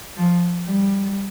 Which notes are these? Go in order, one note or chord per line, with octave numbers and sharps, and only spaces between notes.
F3
G3